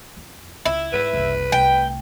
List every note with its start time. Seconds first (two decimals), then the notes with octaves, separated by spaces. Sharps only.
0.17 F2
0.66 C#2 E4
0.93 G#2 B4
1.13 F#1 C2
1.52 C2 A3 G5